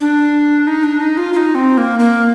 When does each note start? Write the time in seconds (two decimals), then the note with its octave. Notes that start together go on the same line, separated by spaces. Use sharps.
0.01 D4
0.67 D#4
0.84 D4
1.00 D#4
1.17 F4
1.33 F4
1.37 D#4
1.55 C4
1.78 A#3
1.99 A#3